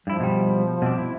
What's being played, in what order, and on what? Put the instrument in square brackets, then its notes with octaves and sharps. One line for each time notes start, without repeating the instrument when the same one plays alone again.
[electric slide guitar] G2 E4 [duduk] F3
[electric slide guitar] B2 G3
B2 C4 D4
E4